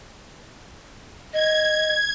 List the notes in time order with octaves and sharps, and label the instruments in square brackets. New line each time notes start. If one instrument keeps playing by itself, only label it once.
[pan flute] D#5 [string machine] G#6